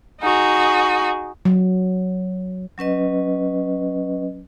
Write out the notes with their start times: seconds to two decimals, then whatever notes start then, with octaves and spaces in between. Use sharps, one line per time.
0.21 D#4 F#4 G#4
1.45 F#3
2.78 F#3 C#4 B4 D#5